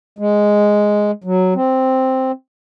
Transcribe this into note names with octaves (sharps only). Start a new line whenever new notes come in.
G#3
F#3
C4